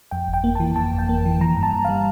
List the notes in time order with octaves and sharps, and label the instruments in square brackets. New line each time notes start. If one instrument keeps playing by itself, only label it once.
[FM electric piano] F2 G5
G1
G5
A#3
E3 A5
F2 A5
G1
G5
A#3
E3
E3 A#5
G2
A5
G2
G3 F5